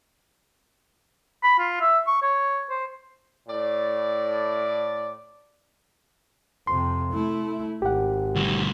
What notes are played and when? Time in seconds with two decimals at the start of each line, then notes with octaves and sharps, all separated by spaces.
1.43 B5
1.59 F4
1.81 E5
2.07 C#6
2.22 C#5
2.70 C5
3.48 A2 D5
6.67 F2 C3 C6
7.12 A3 E4
7.82 G#1 G4 F#5
8.35 D2 G3